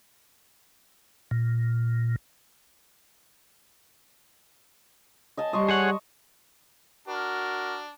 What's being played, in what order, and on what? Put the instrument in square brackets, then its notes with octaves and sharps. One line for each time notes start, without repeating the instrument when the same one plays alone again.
[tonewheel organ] A#2
[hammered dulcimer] D#5 G#5 A5
[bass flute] G3 [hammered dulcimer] D#5 C6 C#6
[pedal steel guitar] G#4 C#5 F#5
[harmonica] D4 [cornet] F#4 [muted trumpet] A#4